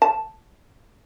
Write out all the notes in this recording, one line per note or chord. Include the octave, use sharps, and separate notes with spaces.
A5